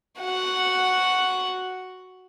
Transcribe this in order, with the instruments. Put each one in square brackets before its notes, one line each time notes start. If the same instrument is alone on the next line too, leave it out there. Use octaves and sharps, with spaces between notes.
[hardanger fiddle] F#4 F#5